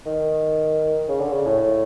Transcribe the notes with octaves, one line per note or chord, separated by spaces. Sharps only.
D#3
C#3
D3
C#3
A2